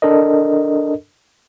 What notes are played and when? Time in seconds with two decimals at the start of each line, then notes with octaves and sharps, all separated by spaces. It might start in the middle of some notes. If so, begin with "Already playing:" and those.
0.02 D4 A4 A#4 D#5